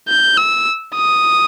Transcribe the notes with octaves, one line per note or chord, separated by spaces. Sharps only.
G6
E6
D#6